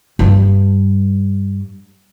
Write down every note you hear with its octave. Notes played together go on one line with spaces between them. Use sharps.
G2 G3